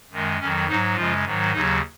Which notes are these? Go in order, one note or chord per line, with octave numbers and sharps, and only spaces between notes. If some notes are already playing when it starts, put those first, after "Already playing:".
F#2 D#3 G#3
F2 D#3 F#3 C#4
G#2 F#3 D#4
F#2 C#3 F3 G#3 F4
G#2 D#3 F#3
D#2 C#3 F#3 D#4